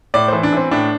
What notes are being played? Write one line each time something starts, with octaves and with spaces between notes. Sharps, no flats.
A2 D5
E3 C5
D4
E3 C4
A2 D4